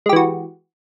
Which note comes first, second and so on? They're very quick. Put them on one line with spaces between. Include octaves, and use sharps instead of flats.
G#3 G4 E3 F#4